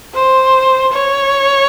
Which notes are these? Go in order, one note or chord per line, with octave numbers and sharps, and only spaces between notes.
C5
C#5